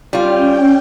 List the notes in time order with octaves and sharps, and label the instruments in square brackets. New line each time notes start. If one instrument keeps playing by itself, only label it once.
[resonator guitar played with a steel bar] G3 F4 [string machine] C#4 G5